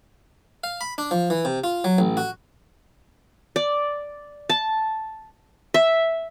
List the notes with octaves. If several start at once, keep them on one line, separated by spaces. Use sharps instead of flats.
F5
B5
D4
F3
E3
C3
F4
F#3
A1
F#4
D5
A5
E5